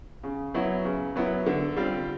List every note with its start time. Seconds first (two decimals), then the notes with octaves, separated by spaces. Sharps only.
0.24 C#3
0.54 F#3 B3 E4
0.85 C#3
1.16 F#3 B3 E4
1.46 D3
1.77 G3 C4 F4